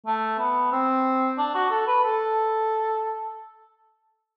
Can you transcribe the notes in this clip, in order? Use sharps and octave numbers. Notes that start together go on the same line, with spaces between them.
A3
B3
C4
D4
F#4
A4
B4
A4